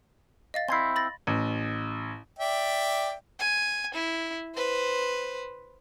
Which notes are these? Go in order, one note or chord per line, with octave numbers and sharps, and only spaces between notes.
D#5 F5 A6
C4 E4 C6 G#6 C7
B5 A6 A#6
A1
D5 E5 G5
G#5
E4
B4 C5